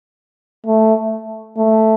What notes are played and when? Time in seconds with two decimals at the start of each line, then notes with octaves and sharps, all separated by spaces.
0.66 A3
1.58 A3